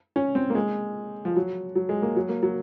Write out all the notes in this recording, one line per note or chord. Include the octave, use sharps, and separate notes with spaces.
C#4
C4
A#3
G#3
F3
F#3
F#3
G#3
A#3
F#3
A#3
F#3